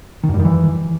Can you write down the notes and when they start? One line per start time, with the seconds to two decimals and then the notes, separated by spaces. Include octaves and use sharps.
0.23 D#3
0.29 F#2
0.34 G3
0.39 D#3
0.45 E3